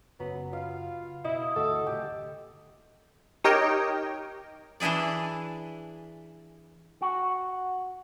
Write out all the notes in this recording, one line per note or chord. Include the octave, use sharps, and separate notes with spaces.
F#1 F#3 B3
F4 B4 F5
B2 E4 D#5
G1 D2 F#4 A4
D1 C3 G4
D#4 G4 A#4 C#5 D#5 G5
E3 D4 E4 G#4 D5
F#4